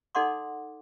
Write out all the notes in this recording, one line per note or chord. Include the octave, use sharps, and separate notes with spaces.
D#4 A4 D5 F#5 C6 D6